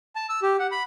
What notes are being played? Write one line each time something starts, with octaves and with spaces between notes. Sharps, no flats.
A5
E6
G4
F#5
B5